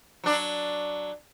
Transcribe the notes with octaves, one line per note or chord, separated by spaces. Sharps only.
F#3 D4